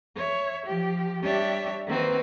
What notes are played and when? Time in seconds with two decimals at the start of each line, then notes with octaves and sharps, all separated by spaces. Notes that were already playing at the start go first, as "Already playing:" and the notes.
0.15 C#5 E5
0.66 F3 G4
1.22 G3 D4 G4 C#5 E5
1.87 D#3 A#3 C4 F#4 B4